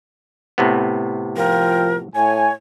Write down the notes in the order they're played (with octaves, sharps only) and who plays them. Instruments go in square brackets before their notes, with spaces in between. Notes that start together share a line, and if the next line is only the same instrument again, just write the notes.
[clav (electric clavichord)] A2 C3 B3
[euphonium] F3 [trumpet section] F4 G5 [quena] A#4
[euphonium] A2 [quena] C#5 [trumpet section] G#5